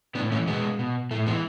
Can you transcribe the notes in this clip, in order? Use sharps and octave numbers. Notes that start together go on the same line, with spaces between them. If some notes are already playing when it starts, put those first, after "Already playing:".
A2 B3 D4
E3 A3 C#4
B2 G#3 B3
B2
A2 A3
E3 G#3 B3